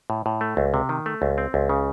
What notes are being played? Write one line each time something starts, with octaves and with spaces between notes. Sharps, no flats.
A2
A2
A3
C#2
C3
D#3
A3
C#2
C4
C#2
C#3